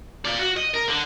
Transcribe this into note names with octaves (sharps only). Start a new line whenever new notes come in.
F4 D5
F#4
D#5
A#4
D3